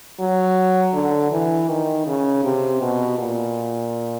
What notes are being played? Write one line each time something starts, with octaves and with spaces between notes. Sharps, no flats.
F#3
D3
E3
D#3
C#3
C3
B2
A#2